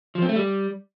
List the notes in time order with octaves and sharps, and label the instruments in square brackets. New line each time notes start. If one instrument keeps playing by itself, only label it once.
[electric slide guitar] F3
C4
A3
G3